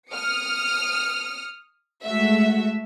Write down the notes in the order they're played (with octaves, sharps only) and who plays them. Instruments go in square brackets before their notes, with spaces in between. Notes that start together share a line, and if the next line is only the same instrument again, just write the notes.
[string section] D#6 F6 C#7
G#3 A3 F#4 E5